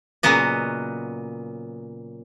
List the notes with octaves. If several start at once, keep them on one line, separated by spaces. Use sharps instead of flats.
A#2 C#3 F#3 B3 D#5